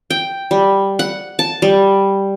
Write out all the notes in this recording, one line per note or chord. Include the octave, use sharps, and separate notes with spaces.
G5
G3
F#5
A5
G3